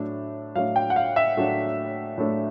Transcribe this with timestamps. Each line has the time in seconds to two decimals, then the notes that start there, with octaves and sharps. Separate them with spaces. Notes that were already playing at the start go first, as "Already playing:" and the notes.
Already playing: A2 F#3 A3 D4
0.56 A2 F#3 A3 D4 F5
0.76 G5
0.90 F#5
0.96 F5
1.16 E5
1.37 A2 F#3 A3 D4
2.18 A2 F#3 A3 D4